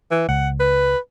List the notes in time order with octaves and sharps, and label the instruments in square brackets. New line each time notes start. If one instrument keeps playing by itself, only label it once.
[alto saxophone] E3
[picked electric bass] C#2 [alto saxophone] F#5
[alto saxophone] B4